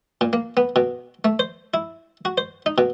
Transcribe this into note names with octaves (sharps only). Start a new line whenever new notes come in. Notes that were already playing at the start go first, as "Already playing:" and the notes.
A#2
A#3
B3
B2
A3
C5
E4
F#4
C5
D#4
B2